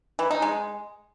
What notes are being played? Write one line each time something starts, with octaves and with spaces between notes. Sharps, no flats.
E3
D#4
G#3